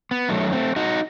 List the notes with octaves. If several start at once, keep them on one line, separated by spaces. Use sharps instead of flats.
B3
F#2 D#3 F#3 A3
A3 C4
D#4 F#4